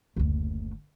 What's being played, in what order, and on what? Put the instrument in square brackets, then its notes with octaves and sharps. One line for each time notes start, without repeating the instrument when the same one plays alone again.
[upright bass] F#1 D2